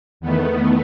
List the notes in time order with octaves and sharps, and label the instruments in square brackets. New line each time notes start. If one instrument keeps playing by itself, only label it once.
[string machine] E2 D#3 A3 B3